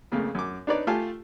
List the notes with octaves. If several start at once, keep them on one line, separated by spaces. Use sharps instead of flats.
F2 C#3 A3 A#3
F#2 D6
D4 D#4 B4 C#5 D5
A3 F4 G4 F5 G#5 A5